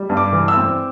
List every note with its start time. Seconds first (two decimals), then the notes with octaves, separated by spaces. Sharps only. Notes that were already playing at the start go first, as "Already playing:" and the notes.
Already playing: G3
0.10 G2
0.17 D6
0.33 E3
0.48 E6
0.57 C4